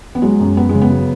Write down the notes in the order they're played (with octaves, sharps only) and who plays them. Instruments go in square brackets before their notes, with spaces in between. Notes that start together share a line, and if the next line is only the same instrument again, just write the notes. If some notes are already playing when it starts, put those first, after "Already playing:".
[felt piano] B3
F#3 G#3
F#2
F#2 B3
C#3 G#3
B3
F#3